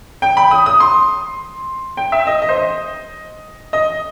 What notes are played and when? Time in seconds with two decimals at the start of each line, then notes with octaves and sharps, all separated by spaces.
0.22 G5
0.37 B5
0.51 D#6
0.66 D#6
0.80 C6
1.97 G5
2.12 E5
2.27 D#5
2.42 D#5
2.49 C5
2.55 D#5
3.73 D#5